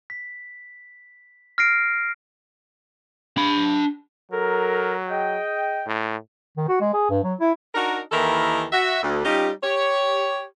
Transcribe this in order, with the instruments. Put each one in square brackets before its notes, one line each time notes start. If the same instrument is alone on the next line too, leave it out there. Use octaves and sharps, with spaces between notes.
[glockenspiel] B6
F6 A#6 C7 D7
[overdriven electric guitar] D4 B5
[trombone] F#3 [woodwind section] A4 A#4
[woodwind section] G#4 D#5 G5
[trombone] A2
[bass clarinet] D#3
F#4
G#3
G#4
G2
F#3
E4
[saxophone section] D4 D#4 F#4 A#4
D#2 D#3 E3 E4 A4 A#4
F#4 E5
D2
G3 C#4 D#4 F4 G4
G4 C#5